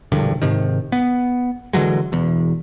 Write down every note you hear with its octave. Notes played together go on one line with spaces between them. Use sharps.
E1 A#1 G2 D3
G#2 C3 D#3
B3
D3 E3 F#3 G#3
E1 E2